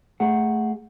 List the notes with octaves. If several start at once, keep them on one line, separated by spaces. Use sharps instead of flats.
A3 G#4 F#5